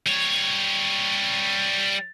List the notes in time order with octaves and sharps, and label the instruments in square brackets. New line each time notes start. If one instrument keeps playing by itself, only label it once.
[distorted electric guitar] G3 C#5